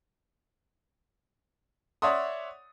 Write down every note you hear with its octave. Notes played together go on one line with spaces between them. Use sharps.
C#5 D5 E5 F#5 C6 D#6